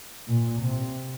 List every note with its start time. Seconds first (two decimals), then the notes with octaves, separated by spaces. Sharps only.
0.28 A#2
0.61 C3